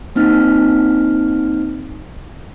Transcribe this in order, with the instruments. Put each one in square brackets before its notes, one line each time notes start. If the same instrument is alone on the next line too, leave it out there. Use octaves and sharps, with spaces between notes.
[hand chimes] A#3 C4 D#4 F6